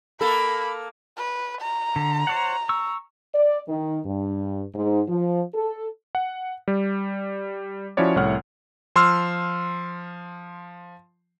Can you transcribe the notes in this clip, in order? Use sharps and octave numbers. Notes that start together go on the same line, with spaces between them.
A#3 A4 B5
B4
A#5
D3
C5 C#5 F#5
C#6 E6
D5
D#3
G2
G#2
F3
A4
F#5
G3
F3 C#4 E4 F#4 C#5 D5
C2 A2 C#5 F#5 F6
F3 C6 E6 F6